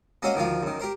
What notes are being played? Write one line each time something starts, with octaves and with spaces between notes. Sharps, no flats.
A#3 C4 C#4 F#4 D#5 F5
D2 D#3 F3 D4 F5
F#2 D#3
G4 A#4 C5